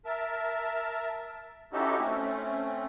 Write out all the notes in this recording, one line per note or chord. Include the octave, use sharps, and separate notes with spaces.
A#4 E5 A5
C#4 D#4 E4 F#4 G4 A4
A3 C4 C#4